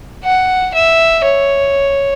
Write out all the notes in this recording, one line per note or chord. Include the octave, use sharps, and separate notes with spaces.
F#5
E5
C#5